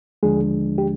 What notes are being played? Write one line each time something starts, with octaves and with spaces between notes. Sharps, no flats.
D#2 D3 F3 G#3 D4 G#4
G4